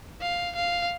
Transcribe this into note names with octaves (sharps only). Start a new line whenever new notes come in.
F5
F5